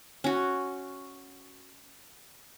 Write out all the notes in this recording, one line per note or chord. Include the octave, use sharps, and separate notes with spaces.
C#4 F#4